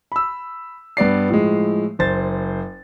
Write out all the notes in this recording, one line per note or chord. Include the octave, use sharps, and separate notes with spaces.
B5 E6
G2 B3 D5 C7
A2 F3 G#3
F#1 C5 A6